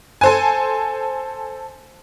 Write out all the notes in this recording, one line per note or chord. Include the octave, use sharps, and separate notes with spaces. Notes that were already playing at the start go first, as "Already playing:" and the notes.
A4 C5 G#5